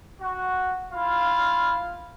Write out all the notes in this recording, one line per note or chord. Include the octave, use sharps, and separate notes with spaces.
F#4
E4 F4 F5